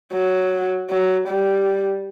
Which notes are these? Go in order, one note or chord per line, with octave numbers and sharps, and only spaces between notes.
F#3
F#3
G3